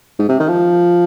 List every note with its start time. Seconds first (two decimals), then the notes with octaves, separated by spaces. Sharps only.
0.19 G#2
0.29 C3
0.39 D#3
0.48 F3